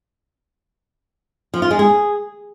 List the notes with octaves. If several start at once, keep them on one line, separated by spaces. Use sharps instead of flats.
F3
F4
G#3
G#4